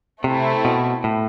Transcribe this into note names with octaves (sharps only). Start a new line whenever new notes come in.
C3 A3 C4 E4
B2
A2